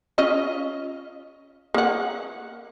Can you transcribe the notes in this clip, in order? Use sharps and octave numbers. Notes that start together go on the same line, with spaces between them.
C#4 F4 D#5
A#3 F#5